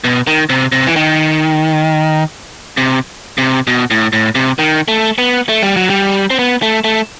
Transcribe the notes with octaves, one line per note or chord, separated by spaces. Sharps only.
B2
D#3
C3
C3
E3
D#3
C3
C3
B2
A2
A2
C3
D#3
A3
B3
A3
G3
F#3
G3
C4
B3
A3
A3